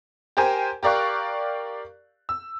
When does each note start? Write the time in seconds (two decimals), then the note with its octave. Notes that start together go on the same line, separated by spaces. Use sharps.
0.37 G4 A#4 C5 G5 G#5
0.83 G4 A#4 D5 F5 C#6 F#6
2.29 E6